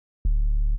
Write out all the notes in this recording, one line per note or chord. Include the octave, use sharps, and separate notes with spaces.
D1